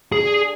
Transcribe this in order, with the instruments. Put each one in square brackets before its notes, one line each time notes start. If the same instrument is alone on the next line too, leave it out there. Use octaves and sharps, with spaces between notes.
[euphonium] D4 [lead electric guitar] G#4